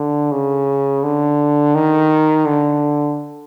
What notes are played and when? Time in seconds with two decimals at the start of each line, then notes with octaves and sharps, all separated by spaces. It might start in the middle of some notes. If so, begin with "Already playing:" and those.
Already playing: D3
0.32 C#3
1.03 D3
1.75 D#3
2.46 D3